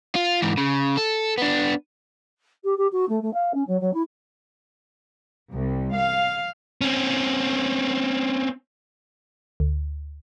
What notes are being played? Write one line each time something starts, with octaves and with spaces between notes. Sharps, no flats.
F4
G#2 E3
C#3
A4
B3 D4
G4
G4
F#4
A3
A3
F5
C#4
F#3
F#3
E4
C2
F5
C4 C#4
D2